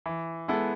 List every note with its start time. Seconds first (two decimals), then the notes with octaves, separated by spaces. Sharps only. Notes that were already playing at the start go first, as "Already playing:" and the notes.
0.06 E3
0.48 G#3 B3 E4 A4